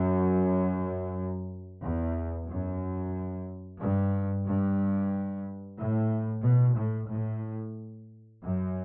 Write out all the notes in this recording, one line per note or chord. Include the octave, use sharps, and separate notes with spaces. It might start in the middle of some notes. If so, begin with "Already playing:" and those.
Already playing: F#2
E2
F#2
G2
G2
A2
B2
A2
A2
F#2